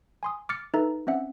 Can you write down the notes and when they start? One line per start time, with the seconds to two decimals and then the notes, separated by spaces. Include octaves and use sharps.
0.23 G#5 C6 D#6
0.49 D6 F6 A6 C#7
0.74 D#4 A4 B4 E5 A#5
1.07 C4 C#4 E5 F#5